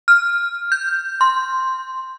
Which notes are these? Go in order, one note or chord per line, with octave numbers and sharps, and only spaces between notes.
F6
G6
C6